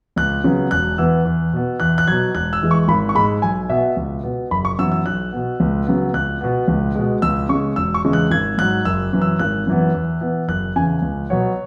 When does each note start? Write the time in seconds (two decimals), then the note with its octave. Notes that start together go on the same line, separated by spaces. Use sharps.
0.16 C#2 F#6
0.44 C#3 F#3 B3
0.71 E1 F#6
0.98 E2 E3 B3 E6
1.25 E2
1.53 B2 B3
1.80 E2 F#6
1.98 F#6
2.07 F#3 G#6
2.12 B2
2.35 E1 F#6
2.53 E6
2.61 E2 E3 G#3
2.71 C#6
2.88 G#1 B5
3.09 C#6
3.15 G#2 G#3 B5
3.42 B1 G#5
3.69 B2 B3 E5
3.97 C#2
4.23 B2 B3
4.51 F#1 B5
4.65 C#6
4.79 F#2 E3 B3 E6
4.92 E6
5.06 B1 F#6
5.32 B2 B3
5.60 C#2
5.87 C#3 F#3 B3
6.14 C#2 F#6
6.41 B2 B3
6.68 C#2
6.95 B2 G#3
7.22 C#2 E6
7.49 C#3 C#6
7.54 G#3
7.76 E1 E6
7.94 C#6
8.05 E2 C#3 G#3
8.13 F#6
8.31 G#1 G#6
8.58 G#2 F#3 F#6
8.85 F#1 E6
9.13 F#2 E3
9.22 E6
9.39 G#1 F#6
9.67 F#2 E3 B3
9.94 E2
10.21 E3 B3
10.48 F#1 F#6
10.76 E2 C#3 G#5
11.02 C#2
11.30 B2 F#3 B3 C#5